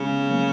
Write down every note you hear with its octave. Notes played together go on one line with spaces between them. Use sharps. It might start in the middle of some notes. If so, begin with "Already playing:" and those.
Already playing: C#3 G#3 B3
F#3 A#3